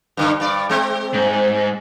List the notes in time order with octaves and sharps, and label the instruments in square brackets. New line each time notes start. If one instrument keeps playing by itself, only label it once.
[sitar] G2 D3
G2 D5
G#3 C4
[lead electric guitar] G#2